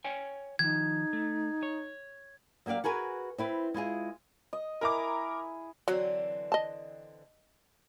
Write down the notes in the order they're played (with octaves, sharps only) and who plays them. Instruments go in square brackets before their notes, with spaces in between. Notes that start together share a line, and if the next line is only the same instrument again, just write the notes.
[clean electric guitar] C#5 G5 G#5
[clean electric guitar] D#3 F3 [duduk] D#4 [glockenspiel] G#6
[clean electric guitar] A3
C#5
[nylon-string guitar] F#3 A#3 G4 D5 F5
F#4 G#4 A#4 B4 G#5
C4 E4 B4
G#3 E4 F4 G#4
[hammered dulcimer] D#5
[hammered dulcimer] E4 G#4 [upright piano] A#4 A#5 D6
[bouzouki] D3 E3 C4 [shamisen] F#3
[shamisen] D#5 A5